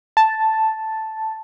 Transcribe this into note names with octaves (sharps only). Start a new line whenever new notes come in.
A5